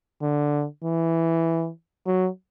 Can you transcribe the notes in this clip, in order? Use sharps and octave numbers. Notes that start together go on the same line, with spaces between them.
D3
E3
F#3